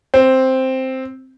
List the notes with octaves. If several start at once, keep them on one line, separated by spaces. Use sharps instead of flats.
C4